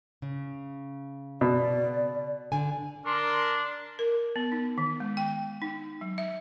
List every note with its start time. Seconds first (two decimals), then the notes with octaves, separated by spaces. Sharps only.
0.22 C#3
1.41 B2 D5
2.52 D3 G#5
3.06 D4 A#4 C6
3.99 A#4
4.36 B3
4.52 D#4
4.78 D#3
5.00 G#3
5.17 G5
5.62 D#4
6.01 F#3
6.18 E5